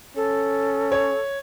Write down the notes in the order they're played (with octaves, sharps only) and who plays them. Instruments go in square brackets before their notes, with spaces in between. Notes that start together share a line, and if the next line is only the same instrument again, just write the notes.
[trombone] C#4 [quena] A4
[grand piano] C#5